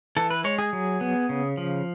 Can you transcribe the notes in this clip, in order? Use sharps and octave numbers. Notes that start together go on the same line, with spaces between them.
E3 A4
B4
G#3 C#5
G#4
F#3
B3
C#3
F3